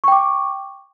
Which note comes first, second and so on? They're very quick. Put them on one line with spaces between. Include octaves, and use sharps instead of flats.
C#6 G5 D6